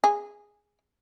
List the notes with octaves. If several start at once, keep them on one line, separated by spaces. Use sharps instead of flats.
G#4